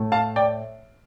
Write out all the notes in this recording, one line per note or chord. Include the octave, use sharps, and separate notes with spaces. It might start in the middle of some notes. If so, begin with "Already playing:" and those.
Already playing: A2 A3
F5 A5
D5 G5